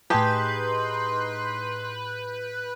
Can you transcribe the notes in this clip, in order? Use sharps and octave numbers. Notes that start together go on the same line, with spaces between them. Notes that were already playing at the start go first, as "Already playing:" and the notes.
A2 D#4 G4 G#4 B4 A5 C6 G6